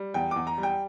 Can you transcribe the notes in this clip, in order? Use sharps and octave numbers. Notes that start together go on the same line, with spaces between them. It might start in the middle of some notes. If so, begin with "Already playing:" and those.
Already playing: G3
E2 G5
E2 D6
A#5
G3
G5